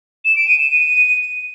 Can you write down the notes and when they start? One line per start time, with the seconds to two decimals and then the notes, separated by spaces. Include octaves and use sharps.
0.25 E7
0.36 D7
0.47 D#7
0.58 E7
0.70 D#7